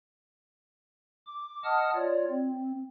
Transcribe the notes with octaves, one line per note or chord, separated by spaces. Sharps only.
D6
D#5 F#5 A5 D#6 F6
F4 C#5 D5
C4